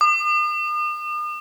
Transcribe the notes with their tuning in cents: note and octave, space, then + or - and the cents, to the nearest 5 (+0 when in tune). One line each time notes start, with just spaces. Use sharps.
D#6 -45